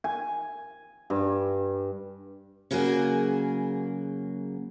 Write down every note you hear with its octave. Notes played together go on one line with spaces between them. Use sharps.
G#5
G2
C#3 F#3 A#3 F#4 G#4